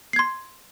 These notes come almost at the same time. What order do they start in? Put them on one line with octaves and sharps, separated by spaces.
C7 G#6 C6